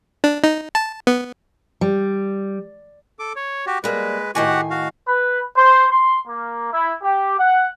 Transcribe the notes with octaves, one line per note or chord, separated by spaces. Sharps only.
D4
D#4
A5
B3
G3
A4 D6
C#5
F#4 G4
G3 G#3 A#3 B4
A2 D#3 F#4 G4 F#5 G#5
F#4 F5
B4
C5
C6
A#3
E4
G4
F#5